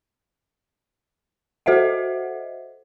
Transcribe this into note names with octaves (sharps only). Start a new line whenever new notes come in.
F#4 A4 C5 D#5 E5 F#5